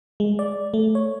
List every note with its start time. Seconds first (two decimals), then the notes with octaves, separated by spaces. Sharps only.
0.20 G#3
0.39 D5
0.74 A3
0.95 C#5